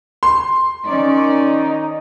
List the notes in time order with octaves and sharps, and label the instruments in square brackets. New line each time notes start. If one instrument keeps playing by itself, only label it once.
[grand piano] C6
[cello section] D#3 C#4 D5 [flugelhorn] D#4